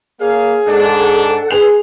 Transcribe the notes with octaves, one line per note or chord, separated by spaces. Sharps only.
A#3 G#4 C#5 F5
G#2 G#3 D4 A4 F#5
G#4 B4 C6 F7